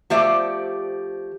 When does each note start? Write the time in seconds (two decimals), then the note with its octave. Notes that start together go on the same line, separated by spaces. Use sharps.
0.10 F3 A3 G4 C5 D5 E5